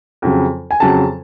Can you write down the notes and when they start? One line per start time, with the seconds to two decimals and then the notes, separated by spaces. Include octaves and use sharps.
0.22 F2 C#3 F#3
0.71 G#5
0.80 F2 C#3 F#3 A5